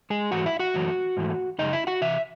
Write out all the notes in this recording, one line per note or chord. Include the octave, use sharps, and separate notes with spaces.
G#3 G#4
G#2 E3 A3 F#4 F#5
E4 E5
F#4 F#5
F#2 E3 A3
G#2 E3 A3
F#2 C#3 G#3 D#4 D#5
E4 E5
F#4 F#5
C3 E3 E5